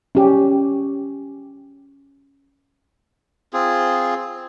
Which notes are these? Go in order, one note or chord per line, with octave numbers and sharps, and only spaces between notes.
C#4 G4
C4 F4 G#4